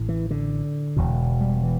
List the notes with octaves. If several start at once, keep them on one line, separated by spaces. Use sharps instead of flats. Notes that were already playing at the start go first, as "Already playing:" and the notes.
Already playing: A1 A2
E3
D3
E1 E2 B2
G3
E3